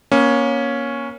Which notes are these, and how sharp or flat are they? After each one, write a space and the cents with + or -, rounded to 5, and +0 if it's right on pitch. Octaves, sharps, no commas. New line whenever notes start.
A#3 +30 C#4 +0